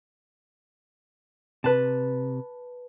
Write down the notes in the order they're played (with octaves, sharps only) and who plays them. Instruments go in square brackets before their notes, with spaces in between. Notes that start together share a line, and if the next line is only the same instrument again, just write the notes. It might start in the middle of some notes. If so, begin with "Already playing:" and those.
[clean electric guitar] C3 [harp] B4 A5